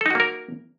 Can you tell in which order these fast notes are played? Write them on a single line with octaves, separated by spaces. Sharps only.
A4 D#4 F#4 A#3 A#4